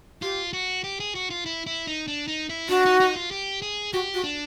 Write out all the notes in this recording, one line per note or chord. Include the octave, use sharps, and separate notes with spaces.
F4 G4
F#4
G4
G#4
F#4
F4
E4
E4
D#4
D4
D#4
E4
D4 F#4
D#4
D#4
F4
G4
G#4
F#4 G4
F#4
D4